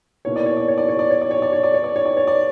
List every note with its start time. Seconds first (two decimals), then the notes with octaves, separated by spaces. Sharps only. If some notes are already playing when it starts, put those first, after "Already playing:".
0.25 B2 A#3 E4 C#5
0.36 D5
0.46 C#5
0.57 D5
0.68 C#5
0.78 D5
0.89 C#5
0.99 D5
1.10 C#5
1.21 D5
1.31 C#5
1.42 D5
1.53 C#5
1.63 D5
1.74 C#5
1.84 D5
1.96 C#5
2.05 D5
2.17 C#5
2.27 D5